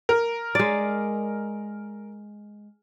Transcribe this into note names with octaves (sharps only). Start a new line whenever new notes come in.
A#4
G#3 D5